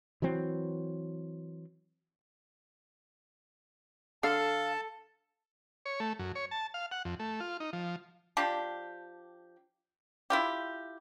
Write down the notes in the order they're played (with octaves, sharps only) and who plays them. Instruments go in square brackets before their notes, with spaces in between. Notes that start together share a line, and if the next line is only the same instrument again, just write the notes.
[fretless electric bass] E3 F#3 C4
[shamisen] D3 [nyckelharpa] A4 [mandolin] F5 [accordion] A5
[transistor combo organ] C#5
A3
F#2
C#5
A5
F5
F#5
F2
A3
F4
D#4
F3
[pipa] F3 D4 G4
E4 F4 G4